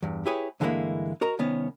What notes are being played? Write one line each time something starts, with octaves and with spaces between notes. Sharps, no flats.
E2 G2
E4 G4 G#4 B4 C#5
G2 D3 E3 G#3 A#3 E4
F#4 A#4 D#5 A#5
C2 D#3 B3 C#4